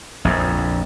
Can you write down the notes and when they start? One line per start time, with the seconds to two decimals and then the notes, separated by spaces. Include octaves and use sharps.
0.25 A#1 F2